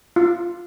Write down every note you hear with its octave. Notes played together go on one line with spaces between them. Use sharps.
F4